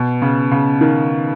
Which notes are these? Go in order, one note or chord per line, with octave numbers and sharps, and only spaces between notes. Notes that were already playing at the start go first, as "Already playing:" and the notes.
Already playing: B2
C#3
C#3
D#3